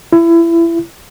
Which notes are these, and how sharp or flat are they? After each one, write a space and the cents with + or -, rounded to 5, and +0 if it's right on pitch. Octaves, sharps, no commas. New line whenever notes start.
E4 +25